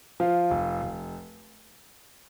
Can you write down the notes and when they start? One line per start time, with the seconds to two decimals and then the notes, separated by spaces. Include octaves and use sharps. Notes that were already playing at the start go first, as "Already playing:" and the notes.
0.20 F3 F4
0.51 F1
0.82 F1